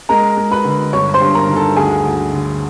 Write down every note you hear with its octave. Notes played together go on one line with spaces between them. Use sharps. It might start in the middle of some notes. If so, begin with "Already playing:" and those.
G#3 A#4 A#5
G#3
B4 B5
D3
G1 C#5 C#6
C5 C6
G2
A#4 A#5
D#3
A4 A5
D2 G#4 G#5
D2
D3